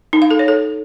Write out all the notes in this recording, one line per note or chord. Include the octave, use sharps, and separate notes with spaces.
D#4
F5
A4
C#5
A4